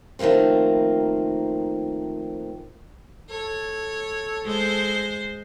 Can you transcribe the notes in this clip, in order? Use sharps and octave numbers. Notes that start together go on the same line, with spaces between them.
D#3 F3 A3 A#3 C4
A4 C#5
G#3 C5